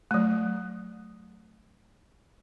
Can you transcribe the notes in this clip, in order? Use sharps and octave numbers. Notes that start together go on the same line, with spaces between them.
F#3 A3